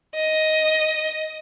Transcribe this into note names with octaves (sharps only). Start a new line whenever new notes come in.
D#5